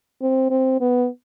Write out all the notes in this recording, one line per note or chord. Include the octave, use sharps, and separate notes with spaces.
C4
C4
B3